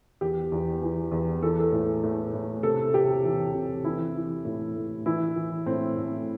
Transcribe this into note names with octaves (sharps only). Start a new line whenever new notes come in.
E2 G4
E2
E3
E2
E3 A4
A4
A2
A2
A2
C3 A4
C3 G4
E3
C3
E3 E4
E3
A2
A2
E3 E4
E3
A2 C4
A2